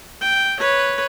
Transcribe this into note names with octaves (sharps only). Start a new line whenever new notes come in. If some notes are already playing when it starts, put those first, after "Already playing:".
G5
B4 C#5